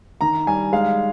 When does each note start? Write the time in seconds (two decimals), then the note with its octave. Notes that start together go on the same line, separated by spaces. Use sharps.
0.21 D#3 A#5
0.47 G3 G#5
0.72 G#3 F5